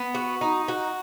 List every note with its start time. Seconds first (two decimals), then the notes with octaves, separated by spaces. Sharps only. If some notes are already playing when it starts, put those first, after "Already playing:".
Already playing: B3
0.15 F#4
0.41 D#4
0.68 F#4